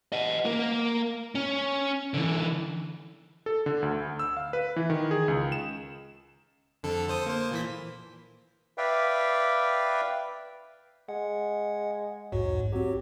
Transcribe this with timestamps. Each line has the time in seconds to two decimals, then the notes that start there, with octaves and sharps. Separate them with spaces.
0.12 D#5 F#5
0.45 A#3 A#4
1.35 C#4
2.14 D3 E3
3.46 A4
3.66 D3
3.82 D2
4.19 E6
4.37 F5
4.53 B4
4.76 E3
4.90 D#3
5.11 G#4
5.28 C#2
5.52 E7
6.83 F2 D3 A4
7.08 A4 C5 D#6
7.26 A#3 C5
7.51 A#2 E3 B6
8.78 B4 D5 E5 F5 G5
11.09 G#3 F#5
12.32 B1 E2 G#2 F#3
12.72 F#3 C4 G4